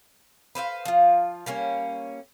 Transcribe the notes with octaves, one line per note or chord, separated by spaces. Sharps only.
B4 C5 E5 F5
F3 F4
G3 A#3 C#4 C#5